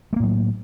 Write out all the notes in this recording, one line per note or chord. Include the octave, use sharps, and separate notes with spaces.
A2 F#3 A3 A#3